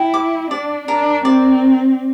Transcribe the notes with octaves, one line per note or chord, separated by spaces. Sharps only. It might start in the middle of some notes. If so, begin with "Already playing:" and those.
Already playing: E4 G5
D6
D4 D5
D4 A#4
C4 D5